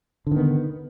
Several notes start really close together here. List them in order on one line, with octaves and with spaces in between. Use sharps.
D3 D#3 B3